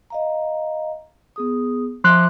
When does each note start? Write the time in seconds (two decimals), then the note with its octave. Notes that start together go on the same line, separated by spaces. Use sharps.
0.10 D#5 F5 A#5
1.36 B3 G#4 D#6
2.04 F3 E5 C6 D6 F#6